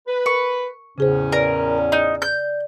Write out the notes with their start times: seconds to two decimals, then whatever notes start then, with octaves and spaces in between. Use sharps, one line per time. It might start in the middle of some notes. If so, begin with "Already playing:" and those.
0.07 B4
0.26 A#4 C#6
0.98 E2 A2 C#3 C#4 G#4 C5
1.32 A#4 B4 D5
1.92 D#4
2.22 G6